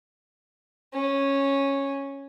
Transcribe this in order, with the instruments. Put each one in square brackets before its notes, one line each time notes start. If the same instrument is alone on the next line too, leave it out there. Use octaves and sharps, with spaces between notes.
[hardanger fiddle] C#4